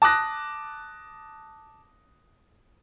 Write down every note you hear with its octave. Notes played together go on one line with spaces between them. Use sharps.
A5 D6 D#6 F#6 A#6